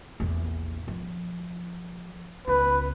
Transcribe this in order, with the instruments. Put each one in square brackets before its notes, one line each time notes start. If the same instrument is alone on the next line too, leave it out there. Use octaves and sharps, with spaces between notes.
[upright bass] A#1 E2
F3
[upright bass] C#2 B3 [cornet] B4